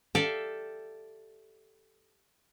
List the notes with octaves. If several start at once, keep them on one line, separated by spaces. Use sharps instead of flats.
G4 A4 D5 E5 F5